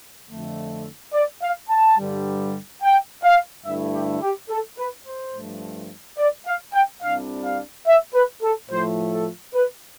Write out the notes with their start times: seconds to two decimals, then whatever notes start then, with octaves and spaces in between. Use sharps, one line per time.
0.30 F2 D3 A3
1.14 D5
1.43 F5
1.70 A5
1.99 G2 D3 G3
2.83 G5
3.24 F5
3.66 G2 D3 A3 E4 E5
3.95 G4
4.22 G4
4.50 A4
4.78 B4
5.06 C5
5.34 G2 F3 A3
6.18 D5
6.46 F5
6.74 G5
7.02 C2 C3 G3 D4 F5
7.44 F5
7.87 E5
8.15 B4
8.43 A4
8.70 A2 F3 A3 C5
9.13 A4
9.55 B4